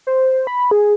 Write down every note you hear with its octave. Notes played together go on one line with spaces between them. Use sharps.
C5
B5
G#4